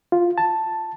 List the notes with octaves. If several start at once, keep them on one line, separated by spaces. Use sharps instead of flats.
F4
A5